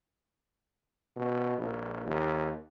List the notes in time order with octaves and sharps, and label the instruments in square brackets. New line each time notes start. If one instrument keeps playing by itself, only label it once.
[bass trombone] B2
A#1
D#2